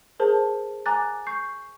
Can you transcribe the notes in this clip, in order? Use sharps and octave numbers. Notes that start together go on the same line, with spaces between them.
G#4 A#4 C5 A5
G#5 A#5 D6 F#6 A6
C#6 G6 C7